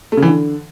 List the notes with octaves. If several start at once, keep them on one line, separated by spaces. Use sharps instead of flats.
A3
C#3
E3
D3